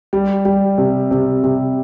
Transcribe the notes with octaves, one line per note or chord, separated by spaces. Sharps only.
G3
G3
C3
C3
C3